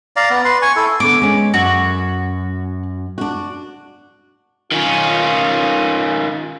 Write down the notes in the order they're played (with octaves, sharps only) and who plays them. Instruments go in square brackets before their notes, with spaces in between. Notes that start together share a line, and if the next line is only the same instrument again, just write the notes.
[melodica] D5 F5 A#5
B3
B4 C6
G#5 C#6
E4 A4
[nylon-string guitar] D3 B3 [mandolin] D6
[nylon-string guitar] G#3 C#4
[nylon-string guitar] F#2 [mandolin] F#4
[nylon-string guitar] D4 F#4
[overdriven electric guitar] D#3 C#4 [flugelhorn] F4